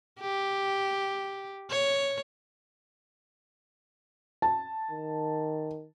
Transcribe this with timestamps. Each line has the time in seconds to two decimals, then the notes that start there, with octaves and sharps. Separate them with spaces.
0.21 G4
1.71 C#5
4.42 A5
4.91 D#3